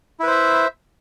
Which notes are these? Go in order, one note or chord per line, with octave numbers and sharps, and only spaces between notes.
E4 B4 C5 E5